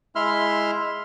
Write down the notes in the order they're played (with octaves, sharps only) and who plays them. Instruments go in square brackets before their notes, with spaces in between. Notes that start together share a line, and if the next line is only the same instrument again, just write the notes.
[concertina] G#3 E4 E5 C6 F6